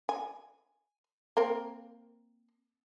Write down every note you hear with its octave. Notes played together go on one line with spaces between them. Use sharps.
G#5
A#3 C4 A#4